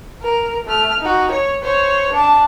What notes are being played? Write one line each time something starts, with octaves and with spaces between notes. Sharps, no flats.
A#4
A3 F6
D#4 F#4
C#5
C5 C#5
D4 A5